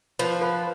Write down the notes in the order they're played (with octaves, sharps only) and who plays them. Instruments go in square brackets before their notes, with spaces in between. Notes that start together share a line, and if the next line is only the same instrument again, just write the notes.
[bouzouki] F3 [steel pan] B4
[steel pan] B4